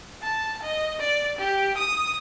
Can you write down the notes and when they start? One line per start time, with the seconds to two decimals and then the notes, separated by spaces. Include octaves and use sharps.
0.22 A5
0.63 D#5
0.99 D5
1.39 G4
1.77 D#6